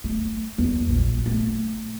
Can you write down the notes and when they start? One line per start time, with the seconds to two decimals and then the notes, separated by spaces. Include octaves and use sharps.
0.04 A3
0.58 E2
0.89 A#1
1.26 A3